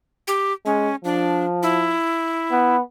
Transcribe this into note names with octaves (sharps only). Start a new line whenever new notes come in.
G4
G#3 C#4
F3 D4
E4
B3